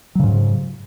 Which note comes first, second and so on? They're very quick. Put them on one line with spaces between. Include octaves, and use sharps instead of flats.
F#3 C#3 G#2